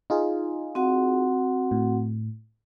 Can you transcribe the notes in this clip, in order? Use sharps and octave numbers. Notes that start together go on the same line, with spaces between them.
D#4 F4 G#4
C4 F#4 F#5
A2